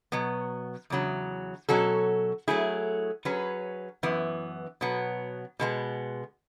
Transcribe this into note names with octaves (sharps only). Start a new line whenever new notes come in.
B2 F#3 B3
E2 C#3 F#3
B2 F#3 C#4 F#4 A4
F#3 A3 E4 G#4
F#3 C#4 G#4 B4
F#2 E3 B3
B2 F#3 B3
B2 G#3 B3